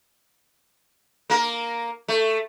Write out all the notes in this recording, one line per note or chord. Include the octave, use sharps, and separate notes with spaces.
A#3 A#4
A3